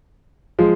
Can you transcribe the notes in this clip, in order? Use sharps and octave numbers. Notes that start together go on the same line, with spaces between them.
F3 G#3